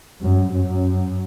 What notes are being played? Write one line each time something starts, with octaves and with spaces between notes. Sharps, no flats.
F#2
F#2